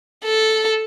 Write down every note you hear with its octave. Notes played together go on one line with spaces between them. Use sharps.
A4